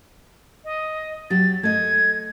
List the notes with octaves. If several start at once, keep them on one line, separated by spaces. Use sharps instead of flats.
D#5
F#3 G4 A6
A3 D#5 G#6